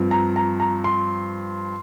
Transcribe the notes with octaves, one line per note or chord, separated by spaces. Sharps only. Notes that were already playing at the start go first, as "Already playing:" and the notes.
Already playing: G2 F3 C4
A#5
A#5
A#5
C6